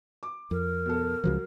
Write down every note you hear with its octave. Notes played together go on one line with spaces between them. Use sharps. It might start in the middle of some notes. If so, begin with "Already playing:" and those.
D6
F2 A#4
B2 A4
C#2 C#3 F3 F#3